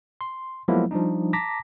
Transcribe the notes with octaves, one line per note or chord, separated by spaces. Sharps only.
C6
F3 F#3 G#3 A#3 B3 E4
F3 G3 D4 D#4
A5 A#5 D6 A#6 B6